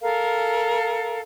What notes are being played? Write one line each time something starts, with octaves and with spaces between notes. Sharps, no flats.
A4 A#4 F5